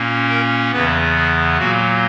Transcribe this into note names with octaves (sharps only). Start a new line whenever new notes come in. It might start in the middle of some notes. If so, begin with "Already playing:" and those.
Already playing: A#2 A#3 C#4
A#4
E2 C#3 E3 B3 B4
G#4
A#2 F#3 A#3 F#4